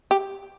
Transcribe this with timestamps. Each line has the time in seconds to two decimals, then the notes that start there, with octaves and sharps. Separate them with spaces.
0.11 G4